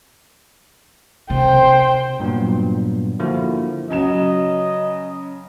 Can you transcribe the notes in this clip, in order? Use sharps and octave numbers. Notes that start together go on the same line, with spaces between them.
C3 C5 G5
G2 A#2 F#3 B3
D3 F3 A#3 E4 F#4
C#3 F#3 D#5 E7